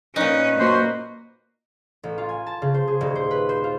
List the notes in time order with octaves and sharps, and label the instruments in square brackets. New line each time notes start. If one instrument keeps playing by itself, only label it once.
[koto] A#2 D#4 [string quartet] C#4 [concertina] B4
[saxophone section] F#2 F#4 C5 [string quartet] A#3
[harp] A1
F4
G#5
A5
C#3
C5
G#4
D#1
C5
B4
C5
F4